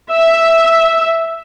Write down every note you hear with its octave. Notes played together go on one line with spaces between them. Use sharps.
E5